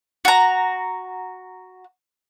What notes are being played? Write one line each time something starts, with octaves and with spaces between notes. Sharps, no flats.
F#4 A#5